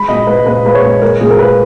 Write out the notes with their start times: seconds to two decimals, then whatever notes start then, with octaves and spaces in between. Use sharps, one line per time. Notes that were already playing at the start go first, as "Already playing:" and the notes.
Already playing: G#3 B5
0.08 A#2 D#5
0.27 G#3 B4
0.46 A#2 B4
0.65 G#3 B4
0.75 C#5
0.84 A#2
1.02 G#3 A#4
1.21 A#2 G#4
1.30 A#4
1.39 G#3 B4